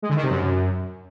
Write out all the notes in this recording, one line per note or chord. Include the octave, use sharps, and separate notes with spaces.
G#3
D3
D#3
C3
F#2